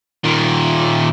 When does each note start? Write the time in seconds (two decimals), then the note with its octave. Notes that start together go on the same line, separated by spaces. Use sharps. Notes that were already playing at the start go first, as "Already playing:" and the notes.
0.24 A#2 D#3